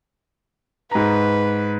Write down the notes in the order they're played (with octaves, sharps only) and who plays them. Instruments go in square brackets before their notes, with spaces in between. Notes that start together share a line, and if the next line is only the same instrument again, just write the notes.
[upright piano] G#2 A#5 [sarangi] B4